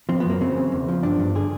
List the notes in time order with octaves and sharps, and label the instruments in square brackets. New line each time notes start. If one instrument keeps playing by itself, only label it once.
[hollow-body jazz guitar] F3 C4
B3
F#2 A#3
C#3 C4
E2
E2
F3
G2 D4
G2
D3 G#4